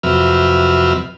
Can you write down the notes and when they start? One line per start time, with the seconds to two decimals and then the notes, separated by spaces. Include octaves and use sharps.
0.03 F2 C3 F#3 B4 E5 F6